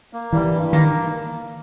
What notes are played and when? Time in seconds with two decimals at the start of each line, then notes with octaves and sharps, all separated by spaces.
0.13 A#3
0.33 E3 G3
0.53 G2
0.72 D#3 A#3